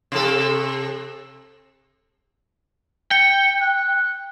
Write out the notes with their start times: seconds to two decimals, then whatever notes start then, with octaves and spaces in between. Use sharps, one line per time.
0.12 C3 A4
3.11 G5 C#7
3.61 F#6